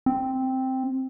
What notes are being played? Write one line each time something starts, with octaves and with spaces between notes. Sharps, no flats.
C4